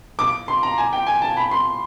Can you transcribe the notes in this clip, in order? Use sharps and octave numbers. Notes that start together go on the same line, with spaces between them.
D6
C6
A#5
G#5
G5
G#5
A5
B5
C6